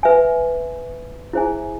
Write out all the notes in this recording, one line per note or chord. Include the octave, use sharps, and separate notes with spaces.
B4 E5 G#5
E4 G#4 C5 E5 G#5